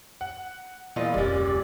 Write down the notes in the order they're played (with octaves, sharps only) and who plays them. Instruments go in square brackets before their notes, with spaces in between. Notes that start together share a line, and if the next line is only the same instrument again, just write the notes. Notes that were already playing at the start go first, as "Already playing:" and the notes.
[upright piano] F#5
[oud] E2 F4 D#5 [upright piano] A#2
[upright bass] F1 D2 [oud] G#3 C#4 [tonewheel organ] G4 D5